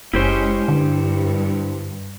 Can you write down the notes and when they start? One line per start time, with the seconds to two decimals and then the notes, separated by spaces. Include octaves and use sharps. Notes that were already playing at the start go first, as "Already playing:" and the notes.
0.14 F#1 G#3 C#4 E4 G4 C5
0.68 G2 D3